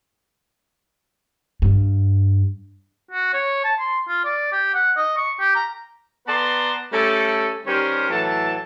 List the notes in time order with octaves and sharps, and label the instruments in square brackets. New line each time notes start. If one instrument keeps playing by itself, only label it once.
[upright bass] G2
[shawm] F#4
C#5
A5
C6
F4
D5
G4
F#5
D#5
C#6
G4
A#5
[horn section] B3 B4 D5 A5 A#5 C6
G3 A3 C#4 A4
D#3 G3 C#4 G4 A#4 C5
A2 E3 F#3 A4 A5